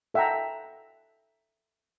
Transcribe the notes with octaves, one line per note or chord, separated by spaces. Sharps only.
A4 E5 F#5 G5 A5 A#5